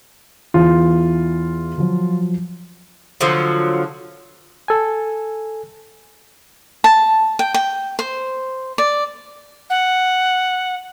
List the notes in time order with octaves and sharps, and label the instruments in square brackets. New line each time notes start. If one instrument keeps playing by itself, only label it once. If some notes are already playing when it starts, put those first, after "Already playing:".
[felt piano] E2 E3 [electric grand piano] F4
[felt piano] F3 F#3
[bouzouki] D3 F3 F#3
[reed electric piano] A4 G#5
[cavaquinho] A5
G5
G5
C5
D5
[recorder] F#5